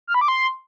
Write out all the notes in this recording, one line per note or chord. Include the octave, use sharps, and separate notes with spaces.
F6
B5
D6
C6